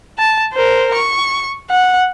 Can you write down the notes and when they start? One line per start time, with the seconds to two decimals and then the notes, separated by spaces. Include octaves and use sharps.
0.19 A5
0.53 A#4 C5
0.94 C#6
1.71 F#5